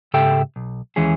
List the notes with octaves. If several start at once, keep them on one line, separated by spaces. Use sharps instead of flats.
G#2 C#3 G4 A4 E5 G5
B1
D#2 E3 G#3 C#4 G#4